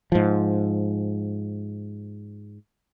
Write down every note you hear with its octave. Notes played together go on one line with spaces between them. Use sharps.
G#2 F3